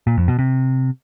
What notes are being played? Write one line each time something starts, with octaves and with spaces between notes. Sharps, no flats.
A#2
F2
B2
C3